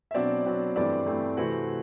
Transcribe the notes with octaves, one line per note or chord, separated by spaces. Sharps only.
E5
B2 F#3 C4 D4 D5
B2 F#3 C4
G2 E3 A3 C4 D4 D5
G2 E3 A3 C4
C3 E3 A3 C4 F#4 F#5